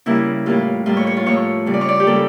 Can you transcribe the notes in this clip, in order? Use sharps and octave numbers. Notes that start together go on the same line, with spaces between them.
C#3 G3 A#3 E4
A2 G3 A#3 F4
A2 G3 A#3 F4
C#5
C#5
F4
A2 F3 A#3 C#5
C#3 G3 A#3
D5
C#5
D5
G4
C#3 G3 A#3 A4